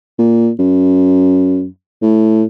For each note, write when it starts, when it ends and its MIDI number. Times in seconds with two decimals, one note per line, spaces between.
0.19 0.51 46
0.59 1.66 42
2.02 2.44 45